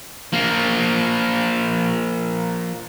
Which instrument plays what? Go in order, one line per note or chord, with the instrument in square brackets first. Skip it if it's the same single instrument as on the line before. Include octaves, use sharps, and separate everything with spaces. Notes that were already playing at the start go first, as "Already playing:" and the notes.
[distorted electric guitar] F3 A#3